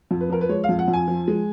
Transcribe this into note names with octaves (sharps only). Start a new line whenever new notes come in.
F2
B4
F3 A#4
B4
G#3 C#5
F5
F2
F#5
F2
G#5
F3
G#3